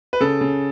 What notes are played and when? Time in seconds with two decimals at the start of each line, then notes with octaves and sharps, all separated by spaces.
0.13 B4
0.20 C#3 A4
0.41 C#3